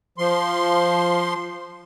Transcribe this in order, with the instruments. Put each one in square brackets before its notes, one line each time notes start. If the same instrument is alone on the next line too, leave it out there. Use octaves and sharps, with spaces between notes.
[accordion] F3 C6